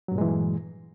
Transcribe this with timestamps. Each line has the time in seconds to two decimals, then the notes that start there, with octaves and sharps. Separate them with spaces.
0.08 F#3
0.12 G2
0.15 A#2
0.18 G#3
0.21 E3